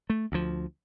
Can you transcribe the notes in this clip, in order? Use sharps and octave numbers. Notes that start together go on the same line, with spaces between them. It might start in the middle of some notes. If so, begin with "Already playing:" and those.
A3
D2 F3